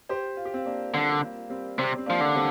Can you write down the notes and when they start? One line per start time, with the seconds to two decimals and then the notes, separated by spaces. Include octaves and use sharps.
0.09 G4 C5
0.37 F4
0.45 G4
0.54 C4 F4
0.65 A#3 D4
0.93 D3 G3 C4
1.10 G3
1.23 A#3
1.50 G3 C4
1.78 C3 G3 C4
1.98 C4
2.06 F3 A#3 D4
2.21 D3
2.35 G3 C4